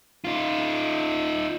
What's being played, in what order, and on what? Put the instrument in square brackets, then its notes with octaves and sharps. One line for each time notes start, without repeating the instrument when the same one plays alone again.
[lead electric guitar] D#4 F4